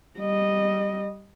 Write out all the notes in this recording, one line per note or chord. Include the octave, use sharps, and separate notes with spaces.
G3 D#5